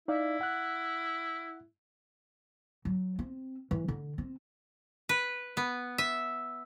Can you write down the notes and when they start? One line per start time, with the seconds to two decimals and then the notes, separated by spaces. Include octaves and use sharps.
0.08 D#4 E4 D5 F5
0.41 F#5 F#6
2.85 F#3
3.19 C4
3.71 E3
3.88 D3
4.18 C4
5.09 B4
5.57 B3
5.98 E5